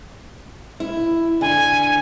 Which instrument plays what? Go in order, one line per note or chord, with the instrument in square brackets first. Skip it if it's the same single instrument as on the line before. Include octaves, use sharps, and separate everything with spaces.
[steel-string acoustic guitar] E4
[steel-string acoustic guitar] D3 [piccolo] G#5